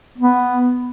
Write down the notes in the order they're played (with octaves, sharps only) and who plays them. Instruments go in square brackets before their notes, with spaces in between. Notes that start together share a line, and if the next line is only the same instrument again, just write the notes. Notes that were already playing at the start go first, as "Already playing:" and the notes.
[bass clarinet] B3